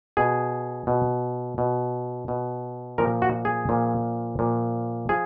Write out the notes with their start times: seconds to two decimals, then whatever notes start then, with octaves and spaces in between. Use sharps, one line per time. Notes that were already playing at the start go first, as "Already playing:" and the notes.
0.17 B2 G#4
0.87 B2
1.58 B2
2.28 B2
2.98 A#2 F3 A#4
3.22 F#4
3.45 G#4
3.69 A#2 F3
4.39 A#2 F3
5.09 F3 G#4